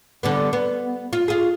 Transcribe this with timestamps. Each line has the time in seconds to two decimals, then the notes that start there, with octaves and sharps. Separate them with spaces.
0.23 D3 G3 B3
0.53 B3
1.13 F4
1.28 F4 G#4